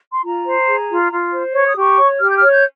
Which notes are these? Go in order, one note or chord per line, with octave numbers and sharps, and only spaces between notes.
C6
F4 A#5
C5
G#4
F4
F4
C5
C#5 C#6
D#6
G4 C#6
C#5
G4 F6
G6
C#5 F6
G6